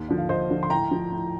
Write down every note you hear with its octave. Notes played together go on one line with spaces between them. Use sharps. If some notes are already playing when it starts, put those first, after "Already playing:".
Already playing: D#2
D3 F3
F5
D#2 C5 D#5
D3 F3
C6
A2 G5 A#5
F3
A2